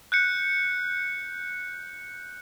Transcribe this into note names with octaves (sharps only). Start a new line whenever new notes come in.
F#6 G6 C#7